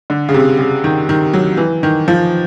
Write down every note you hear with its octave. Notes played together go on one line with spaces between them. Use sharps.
D3
C#3
C3
C#3
D#3
D#3
F#3
E3
D#3
F3